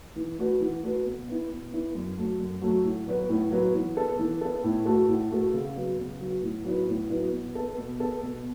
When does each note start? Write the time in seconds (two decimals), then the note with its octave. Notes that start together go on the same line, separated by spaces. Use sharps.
0.16 E3
0.38 A3 F#4 B4
0.60 E3
0.83 A3 F#4 B4
1.05 B2
1.28 B3 E4
1.50 B2
1.73 B3 E4
1.95 F#2
2.17 F#3 A3
2.40 F#2
2.62 F#3 A3
2.84 A2
3.08 F#3 B3 F#4 B4
3.29 A2
3.51 F#3 B3 F#4 B4
3.74 E3
3.97 B3 A4
4.19 E3
4.41 B3 A4
4.64 A2
4.85 A3 F#4 A4
5.08 A2
5.31 A3 F#4 A4
5.54 C#3
5.76 F#3 B3
5.99 C#3
6.20 F#3 B3
6.42 A2
6.65 F#3 B3 E4 B4
6.88 A2
7.10 F#3 B3 E4 B4
7.33 B2
7.55 B3 A4
7.77 B2
8.00 B3 A4
8.22 B2